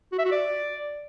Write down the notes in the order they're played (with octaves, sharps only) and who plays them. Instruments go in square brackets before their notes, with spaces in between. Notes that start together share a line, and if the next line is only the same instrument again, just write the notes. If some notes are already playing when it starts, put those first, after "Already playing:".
[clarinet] F#4
E5
F#4
D5